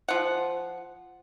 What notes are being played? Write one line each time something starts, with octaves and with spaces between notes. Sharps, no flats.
F3 F#5